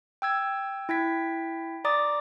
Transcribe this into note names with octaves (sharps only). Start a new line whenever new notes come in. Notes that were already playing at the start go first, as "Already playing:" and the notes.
G5 E6 G#6
E4 G5 G#6 B6
D5 A#5 D6 D#6 A6